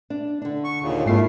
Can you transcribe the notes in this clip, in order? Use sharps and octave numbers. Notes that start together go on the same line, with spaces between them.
D4
D3 D4
C#6
D#2 A#2 C#3
G#2 A3 A#3 E4 F4 C7